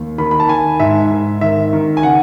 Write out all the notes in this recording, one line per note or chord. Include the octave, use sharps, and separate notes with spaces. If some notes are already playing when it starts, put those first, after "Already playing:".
Already playing: D#2
D#3 B5
B5
A5
D#3 G#5
G#2 E5
G#2
D#3 E5
D#3
G#5
C#3 F#5